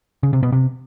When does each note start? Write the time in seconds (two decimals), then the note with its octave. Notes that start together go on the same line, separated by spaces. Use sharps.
0.23 C#3
0.33 C3
0.43 B2
0.52 C3